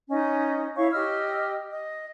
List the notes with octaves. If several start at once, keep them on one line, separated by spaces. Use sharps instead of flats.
C#4 D#4 D#5
E4 C#5 F5 C#6
G4 D#5 E6 F6
D#5